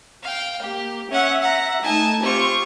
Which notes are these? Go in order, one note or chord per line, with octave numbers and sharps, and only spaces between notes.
F5 G5
A#3 G4
C#4 E5 F#5
F#5 A#5
A3 D#4 G#5 A5
C4 F4 G4 C5 C#6